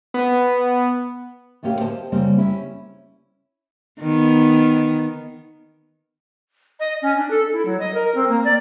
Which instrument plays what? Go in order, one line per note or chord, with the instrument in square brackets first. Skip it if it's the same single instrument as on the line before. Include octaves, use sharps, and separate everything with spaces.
[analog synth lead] B3
[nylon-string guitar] D2 A2 A#3 C#4 G4 F5
C5 D#5 A5
C#3 G3 A#3 C4 C5
C#4 E4
[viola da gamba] D#3 B3
[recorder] D#5
C#4
D4
A4
E4
F#3
D#5
A#4
C4
A#3
D5